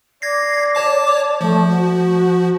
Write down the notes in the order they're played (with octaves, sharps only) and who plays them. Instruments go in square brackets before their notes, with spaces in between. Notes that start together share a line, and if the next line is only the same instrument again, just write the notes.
[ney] D5 [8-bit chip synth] G#6 A#6 C7
[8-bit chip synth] C#5 A5 D6
[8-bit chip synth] F3 [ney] A3
[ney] F#4